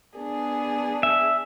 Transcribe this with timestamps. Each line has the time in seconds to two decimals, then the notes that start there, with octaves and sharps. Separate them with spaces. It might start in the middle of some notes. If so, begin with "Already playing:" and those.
0.18 B3 D4 G#4
1.03 E5